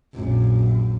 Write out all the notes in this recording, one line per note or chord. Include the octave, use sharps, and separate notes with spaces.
A#1 F#2